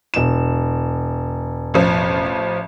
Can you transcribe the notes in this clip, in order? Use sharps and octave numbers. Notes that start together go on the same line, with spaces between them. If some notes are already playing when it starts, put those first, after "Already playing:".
E1 E7
A1 F3